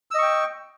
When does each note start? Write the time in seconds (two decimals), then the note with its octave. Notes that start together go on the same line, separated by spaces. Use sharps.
0.11 E6
0.15 D#5
0.18 C#6
0.22 G5